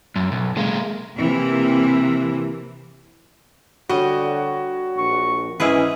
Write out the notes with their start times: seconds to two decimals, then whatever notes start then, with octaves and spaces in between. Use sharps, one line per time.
0.16 F#2
0.32 B1
0.57 G#3 A#3
1.17 C3 E3 A#3
3.89 D3 G3 F#4 C#5 D#5
4.98 A#1 C#6
5.60 G#2 E3 C#4 E4 G#4 B4 D#5